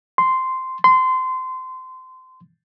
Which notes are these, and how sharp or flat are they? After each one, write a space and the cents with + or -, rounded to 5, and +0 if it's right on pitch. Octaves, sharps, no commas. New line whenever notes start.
C6 -10
C6 -25